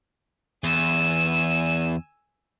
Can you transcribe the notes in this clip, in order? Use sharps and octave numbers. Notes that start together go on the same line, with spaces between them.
E2 G#5 E6